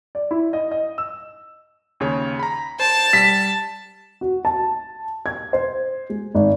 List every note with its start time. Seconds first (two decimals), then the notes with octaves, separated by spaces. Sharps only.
0.15 D5
0.31 E4
0.53 D#5
0.71 D#5
0.98 E6
2.00 D#2 C#3 C#5
2.39 A#5 B5
2.80 C5 A5
3.13 G3 B6
4.21 F#4
4.45 A5
5.26 G#6
5.53 C5
6.10 G#3
6.35 G#1